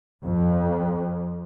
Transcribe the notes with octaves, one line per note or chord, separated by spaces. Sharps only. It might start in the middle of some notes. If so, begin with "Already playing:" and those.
F2